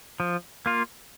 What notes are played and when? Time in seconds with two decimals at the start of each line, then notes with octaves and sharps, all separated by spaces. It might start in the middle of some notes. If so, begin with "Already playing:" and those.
0.20 F3
0.66 A#3 F4